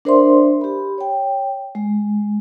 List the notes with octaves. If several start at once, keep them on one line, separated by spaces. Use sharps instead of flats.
D4 A#4 C5 D5 E5 C6
G4 B5
C#5 G5
G#3